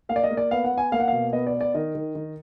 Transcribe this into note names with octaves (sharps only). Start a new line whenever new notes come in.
A#3 F5
D5
D#5
A#3
D5
B3 F5
F#5
B3
G#5
A#3 F5
F#5
B2 F5
B3 D#5
D5
B3
D5
D#3 D#5
D#3
D#3